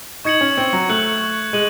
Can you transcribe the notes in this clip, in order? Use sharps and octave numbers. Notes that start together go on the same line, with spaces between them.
D#4 C#6 G#6 C#7 F#7
C#4
C4
F#3
A3 F#6 C#7 F#7
G#3 D#7 F#7